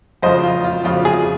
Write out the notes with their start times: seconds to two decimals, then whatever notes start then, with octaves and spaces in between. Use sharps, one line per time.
0.22 F2 C#3 F3 C5 D#5
0.43 F4
0.64 F4
0.84 F2 C#3 F3 F4
1.05 F4 G#4